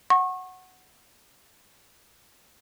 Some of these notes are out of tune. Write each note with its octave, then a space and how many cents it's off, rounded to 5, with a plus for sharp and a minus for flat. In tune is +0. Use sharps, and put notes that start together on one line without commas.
F#5 +0 C#6 -30